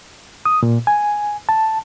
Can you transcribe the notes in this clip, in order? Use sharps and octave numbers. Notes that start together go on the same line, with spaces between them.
D#6
A#2
G#5
A5